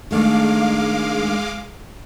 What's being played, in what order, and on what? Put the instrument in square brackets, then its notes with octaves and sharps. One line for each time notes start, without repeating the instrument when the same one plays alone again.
[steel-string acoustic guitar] D#3 A3 D4 [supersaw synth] G#3 F5 D6